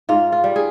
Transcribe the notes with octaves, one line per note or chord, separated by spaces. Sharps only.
G#2 F4
F4
G3
G#4